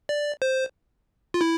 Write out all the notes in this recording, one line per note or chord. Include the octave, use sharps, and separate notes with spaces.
D5
C5
F4
E4